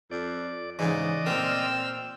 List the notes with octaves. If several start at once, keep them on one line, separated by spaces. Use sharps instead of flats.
F2 D5
G#2 C#3 E3 D5 D#5
A#2 C4 A#4 E6 F6